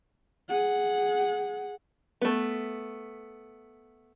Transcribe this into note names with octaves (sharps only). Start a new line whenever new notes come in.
G#4 F#5
A3 B3